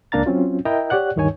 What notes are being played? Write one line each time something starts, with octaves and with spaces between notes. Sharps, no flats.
C#2 A#3 D4 F5 A#5 A6
F#3 C4 C#4 F4
E4 A#4 D#5 E5 G5 A#5
G4 C#5 D5 F#5 F#6
D2 G2 D#3 D#4 C#5 G#5